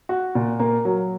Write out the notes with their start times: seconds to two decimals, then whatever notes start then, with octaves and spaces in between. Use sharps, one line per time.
0.09 F#4
0.35 A#2
0.59 A#3
0.85 F#3